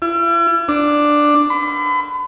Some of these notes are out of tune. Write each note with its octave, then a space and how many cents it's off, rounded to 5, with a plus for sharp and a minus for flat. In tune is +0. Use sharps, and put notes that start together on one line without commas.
E4 +45
D4 +5
B5 +40